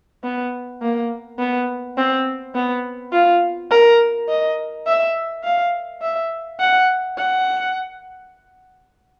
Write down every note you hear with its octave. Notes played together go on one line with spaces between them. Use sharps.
B3
A#3
B3
C4
B3
F4
A#4
D#5
E5
F5
E5
F#5
F#5